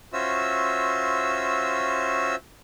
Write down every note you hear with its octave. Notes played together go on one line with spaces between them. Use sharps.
C#4 F4 F#4 C5 E5 E6